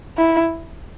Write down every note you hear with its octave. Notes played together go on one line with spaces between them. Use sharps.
E4